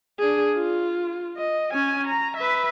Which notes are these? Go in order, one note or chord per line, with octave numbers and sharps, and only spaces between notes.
D4 G#4
F4
D#5
C#4 G#5
A#5
B4 E5